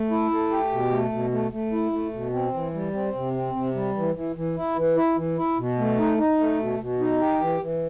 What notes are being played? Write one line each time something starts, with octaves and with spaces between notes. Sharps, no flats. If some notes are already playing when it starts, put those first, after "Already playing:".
Already playing: A3
E4
A3
G4
B2
A3
B2
A3
A3
E4
A3
B2
C4
E3
G3
C4
C3
C4
C3
G3
E3
E3
E3
E4
E3
E4
E3
E4
B2
A3
D#4
D#4
A3
B2
B2
D#4
G4
E3
E3